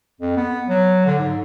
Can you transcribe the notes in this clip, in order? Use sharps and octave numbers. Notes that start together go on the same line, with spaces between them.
F2
B3
F#3
D3
G#2